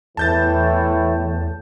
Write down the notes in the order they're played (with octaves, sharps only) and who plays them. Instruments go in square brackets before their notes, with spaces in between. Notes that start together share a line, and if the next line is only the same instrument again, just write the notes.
[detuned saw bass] E2 [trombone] A2 [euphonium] E3 [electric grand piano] A5 G6 A6